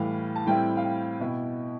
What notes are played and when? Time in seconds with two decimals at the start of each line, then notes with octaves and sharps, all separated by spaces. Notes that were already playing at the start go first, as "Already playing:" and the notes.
Already playing: A2 E3 G3 F5
0.36 A5
0.46 A2 G3 C4 E4 G5
0.77 F5
0.84 G5
1.20 B2 B3 E4